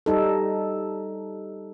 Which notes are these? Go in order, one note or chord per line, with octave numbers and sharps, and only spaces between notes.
G3 D#4 A4